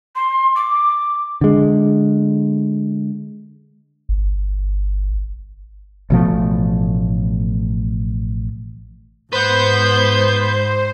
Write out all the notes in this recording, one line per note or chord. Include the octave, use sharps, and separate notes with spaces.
C6
D6
D3 G#3
G1
A1 B2 F3 A3
G#2 B4 C5 F#5 G6